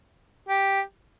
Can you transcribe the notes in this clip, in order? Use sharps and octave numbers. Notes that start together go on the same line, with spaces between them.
G4